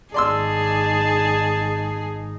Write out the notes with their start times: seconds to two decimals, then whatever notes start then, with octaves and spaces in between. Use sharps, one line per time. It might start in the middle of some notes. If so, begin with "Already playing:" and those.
0.14 G#1 D#4 G#4 D5 A5 C6 E6